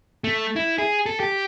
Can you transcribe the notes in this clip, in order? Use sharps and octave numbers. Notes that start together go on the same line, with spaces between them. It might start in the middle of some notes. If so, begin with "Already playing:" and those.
A3
E4
G#4
A4
G4